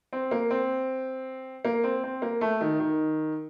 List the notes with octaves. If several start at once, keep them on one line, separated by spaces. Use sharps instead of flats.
C4
A#3
C4
A#3
C4
C4
A#3
A3
D#3
D#3